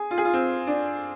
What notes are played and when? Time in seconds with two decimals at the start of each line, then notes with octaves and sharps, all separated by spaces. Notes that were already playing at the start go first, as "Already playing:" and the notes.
Already playing: G#4
0.11 F4
0.18 G#4
0.25 F4
0.33 C4
0.67 D4